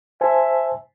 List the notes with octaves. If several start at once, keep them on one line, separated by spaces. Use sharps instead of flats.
C5 E5 G#5 A5